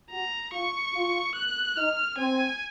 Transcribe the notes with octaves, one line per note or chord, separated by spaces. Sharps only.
F#4 A#5
F4 C#6
F4
F#6
D#4 F6
C4 G#5